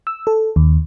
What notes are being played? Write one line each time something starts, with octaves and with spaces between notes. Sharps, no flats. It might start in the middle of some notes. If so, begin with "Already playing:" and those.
E6
A4
D#2